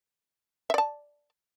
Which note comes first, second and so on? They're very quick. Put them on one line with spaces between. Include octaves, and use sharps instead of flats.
E5 D5 A5